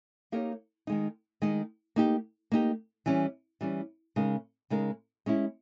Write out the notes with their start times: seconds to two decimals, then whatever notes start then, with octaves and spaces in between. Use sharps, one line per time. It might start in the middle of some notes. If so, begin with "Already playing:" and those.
0.32 A#3 D#4 G4 A#4 C#5
0.87 D#3 G#3 D#4
1.42 D#3 G#3 D#4
1.96 A#3 D#4 G4
2.52 A#3 D#4 G4
3.06 E3 G3 C#4
3.61 E3 G3 C#4
4.16 C#3 G#3 D#4 A#4
4.70 C#3 G#3 D#4 A#4
5.26 G#3 C#4 E4